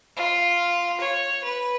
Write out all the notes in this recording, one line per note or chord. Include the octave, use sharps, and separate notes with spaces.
F4
C#5
B4